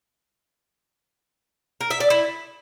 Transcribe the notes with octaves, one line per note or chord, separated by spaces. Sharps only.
A#4
E5
D5
E4